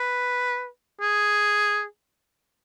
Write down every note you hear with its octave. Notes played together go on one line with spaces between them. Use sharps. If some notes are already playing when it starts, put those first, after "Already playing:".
Already playing: B4
G#4